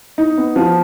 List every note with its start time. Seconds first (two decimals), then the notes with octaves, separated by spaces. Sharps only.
0.18 D#4
0.38 B3
0.56 F3